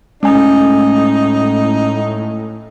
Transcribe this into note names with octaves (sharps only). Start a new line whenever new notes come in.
A2 G#3 C#4 D#4 G#5